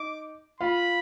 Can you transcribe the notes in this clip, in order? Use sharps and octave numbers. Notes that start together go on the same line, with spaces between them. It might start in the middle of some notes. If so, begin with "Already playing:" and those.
Already playing: D#4 D6
F4 F5 B5